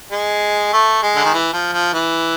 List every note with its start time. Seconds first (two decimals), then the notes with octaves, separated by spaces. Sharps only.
0.12 G#3
0.73 A3
1.03 G#3
1.15 D3
1.24 D#3
1.33 E3
1.53 F3
1.73 F3
1.93 E3